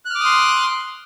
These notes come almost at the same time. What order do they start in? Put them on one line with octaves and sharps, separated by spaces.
F#6 F6 D6 D#6 C6